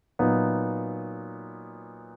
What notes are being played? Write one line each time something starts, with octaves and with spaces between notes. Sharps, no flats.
A#2 F#3 B3 D#4